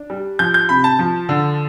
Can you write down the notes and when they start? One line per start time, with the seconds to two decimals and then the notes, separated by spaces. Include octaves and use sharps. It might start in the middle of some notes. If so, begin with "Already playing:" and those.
Already playing: D4
0.10 G3
0.39 F3 G6
0.54 G6
0.69 C3 B5
0.84 A5
0.99 F3
1.29 D3